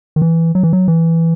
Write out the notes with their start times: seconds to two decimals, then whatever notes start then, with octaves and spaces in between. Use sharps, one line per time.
0.16 D#3
0.22 E3
0.55 F#3
0.63 E3
0.73 F#3
0.88 E3